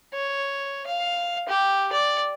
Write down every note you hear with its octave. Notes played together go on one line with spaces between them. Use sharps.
C#5
F5
G4
D5